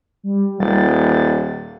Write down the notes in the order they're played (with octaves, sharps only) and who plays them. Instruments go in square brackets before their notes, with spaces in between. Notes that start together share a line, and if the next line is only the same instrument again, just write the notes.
[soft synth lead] G3
[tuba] D#1 [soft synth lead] A6